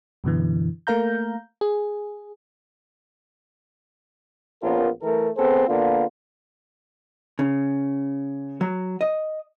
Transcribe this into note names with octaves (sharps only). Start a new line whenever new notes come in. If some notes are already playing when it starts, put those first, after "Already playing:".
F#2 B2 D3 E3
A3 A#3 A#4 F5 A#5 G6
G#4
A#1 B3 C#4 F4 A#4
E3 A3 A#4
B3 C4 G#4 A4 C5
D3 A#3 B3 D4 F4
C#3
F#3
D#5